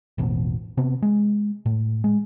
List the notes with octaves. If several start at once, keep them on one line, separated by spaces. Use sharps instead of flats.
A1 E2 B2
C3 B3
G#3
A2
G#3